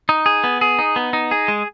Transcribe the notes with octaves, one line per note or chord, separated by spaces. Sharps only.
D#4
G#4
B3
G#4
D#4
B3
D#4
G#4
G#3